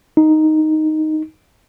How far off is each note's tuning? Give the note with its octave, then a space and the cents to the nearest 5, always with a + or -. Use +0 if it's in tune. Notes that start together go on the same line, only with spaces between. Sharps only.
D#4 +0